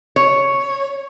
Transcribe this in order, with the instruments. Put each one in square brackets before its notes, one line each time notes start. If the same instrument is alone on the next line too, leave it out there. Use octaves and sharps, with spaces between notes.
[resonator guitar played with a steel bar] C#5